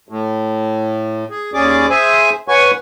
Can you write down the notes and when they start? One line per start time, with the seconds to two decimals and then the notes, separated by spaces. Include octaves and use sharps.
0.09 A2
1.30 G#4
1.54 D#2 C#4 G#4 D5 D6
1.90 G#4 C5 E5 G#5
2.48 B4 C#5 F#5 G#5 C#6